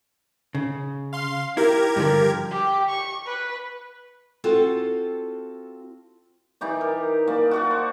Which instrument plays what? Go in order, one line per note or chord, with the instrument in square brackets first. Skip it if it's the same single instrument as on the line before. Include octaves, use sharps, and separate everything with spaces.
[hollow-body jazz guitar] C#3
[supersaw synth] F5 C6
[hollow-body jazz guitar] E4 [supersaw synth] G4 A#4 G#6
[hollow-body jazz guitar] G2 D3 F3
[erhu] G4
C#6
B4
[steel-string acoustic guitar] C4 F4 F#4 A4
[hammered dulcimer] E3 D#4 G4 D5
A#4
A#3 D5 A5
F#4 D5 F#5
C5